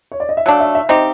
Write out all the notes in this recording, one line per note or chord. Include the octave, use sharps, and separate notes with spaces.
C#5
D5
D#5
E5
F#3 A3 D4 F5
E5
E5
C4 D#4 G4 D#5